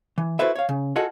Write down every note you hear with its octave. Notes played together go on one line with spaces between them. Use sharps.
E3
E4 F#4 A4 B4 C5 E5
C#5 F5
C#3
F4 F#4 G#4 A4 D#5 F#5